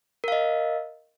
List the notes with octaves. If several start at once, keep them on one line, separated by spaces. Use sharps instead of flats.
A#4 D#5 F5